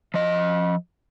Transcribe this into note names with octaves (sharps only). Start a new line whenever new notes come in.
F3 D#5